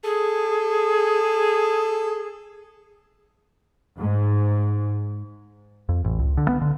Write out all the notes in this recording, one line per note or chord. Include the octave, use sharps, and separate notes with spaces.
G#4 A4
G#2
F2
A1
C#2
D3
B3
D3